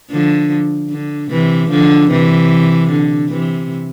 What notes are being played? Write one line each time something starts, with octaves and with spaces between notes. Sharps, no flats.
D3 F3
D3
C3 E3
D3 F3
C3 E3
D3
C3 E3